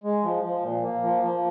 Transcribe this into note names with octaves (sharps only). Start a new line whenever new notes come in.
G#3
F3
F3
A#2
A#3
F3
F3